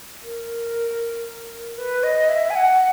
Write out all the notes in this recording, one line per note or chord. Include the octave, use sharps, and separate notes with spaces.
A#4
B4
D#5
E5
G#5
F#5